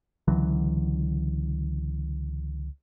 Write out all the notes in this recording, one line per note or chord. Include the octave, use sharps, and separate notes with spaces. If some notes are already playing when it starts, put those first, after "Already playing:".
C#2 D3 E3 F#3